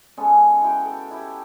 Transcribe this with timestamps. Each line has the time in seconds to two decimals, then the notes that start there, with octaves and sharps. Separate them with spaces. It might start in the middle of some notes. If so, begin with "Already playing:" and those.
0.17 G#3 B3 C#4 A4
0.62 E4 F#4 F#5 G5
0.85 A4
1.11 E4 G4